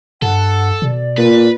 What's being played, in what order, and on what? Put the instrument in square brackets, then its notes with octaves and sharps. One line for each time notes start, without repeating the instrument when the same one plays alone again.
[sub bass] G2 [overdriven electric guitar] A4 [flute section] F#5
[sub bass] B2 [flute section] D5
[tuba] A#2 [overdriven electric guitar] B4